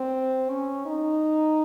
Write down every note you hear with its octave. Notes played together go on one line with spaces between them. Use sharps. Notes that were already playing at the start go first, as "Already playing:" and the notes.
Already playing: C4
C#4
D#4